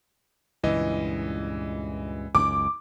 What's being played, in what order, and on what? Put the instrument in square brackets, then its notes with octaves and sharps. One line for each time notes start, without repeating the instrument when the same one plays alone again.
[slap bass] C#2 G2 A#2 [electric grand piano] E3 D#5
[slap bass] C#2 F#2 [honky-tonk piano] D6